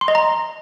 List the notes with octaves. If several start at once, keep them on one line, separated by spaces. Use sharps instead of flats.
C6
D#5
A#5